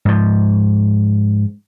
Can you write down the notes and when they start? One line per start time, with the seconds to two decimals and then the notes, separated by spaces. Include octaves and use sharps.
0.05 G#2 F3